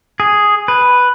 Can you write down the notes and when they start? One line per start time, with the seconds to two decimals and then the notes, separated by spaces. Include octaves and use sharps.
0.20 G#4
0.68 B4